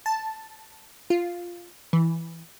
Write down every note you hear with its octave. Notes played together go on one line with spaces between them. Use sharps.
A5
F4
E3